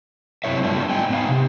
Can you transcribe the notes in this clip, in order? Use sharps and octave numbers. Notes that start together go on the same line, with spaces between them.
F#2 C3 F3 E4 C#5 E5
G3 A3 B3 D4 F4
G#2 D#4 G5 G#5
B3 D#4 F5
C3